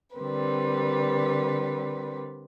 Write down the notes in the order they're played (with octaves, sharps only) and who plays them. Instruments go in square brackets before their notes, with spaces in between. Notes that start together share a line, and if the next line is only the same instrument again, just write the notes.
[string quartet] D3 G3 C4 A#4 B4